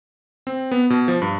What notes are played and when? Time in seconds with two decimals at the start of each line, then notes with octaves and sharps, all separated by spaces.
0.47 C4
0.71 B3
0.90 B2
1.08 F3
1.22 G2